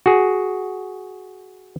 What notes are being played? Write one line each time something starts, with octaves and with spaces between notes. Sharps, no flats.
F#4 G#4